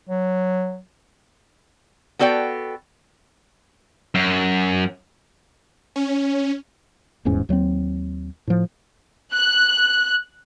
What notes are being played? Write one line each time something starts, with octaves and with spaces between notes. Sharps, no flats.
F#3
B3 F#4 A4 D5 G5
F#2
C#4
D#1 E2 G#2 C#4
D#2 F#3 G#3 C4
A2 F3
F#6